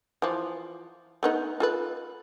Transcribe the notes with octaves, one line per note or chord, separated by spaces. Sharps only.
E3 F3
A3 B3 D#4
F4 A4 B4